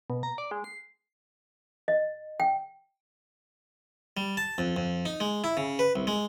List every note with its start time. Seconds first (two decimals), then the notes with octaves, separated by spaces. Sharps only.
0.10 B2
0.23 A#5
0.38 D5
0.51 G#3
0.64 C7
1.88 D#5
2.40 G5
4.17 G3
4.37 A5
4.58 F2
4.76 F2
5.05 D#4
5.20 G#3
5.44 E4
5.57 C#3
5.79 B4
5.96 C2
6.07 G#3